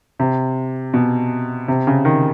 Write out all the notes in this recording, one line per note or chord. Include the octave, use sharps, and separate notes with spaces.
C3
B2
C3
C#3
D#3